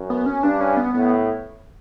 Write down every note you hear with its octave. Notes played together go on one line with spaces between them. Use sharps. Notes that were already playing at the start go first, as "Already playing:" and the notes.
Already playing: F#2
B3
C#4
G2 D4
C#4
B3
A2 B3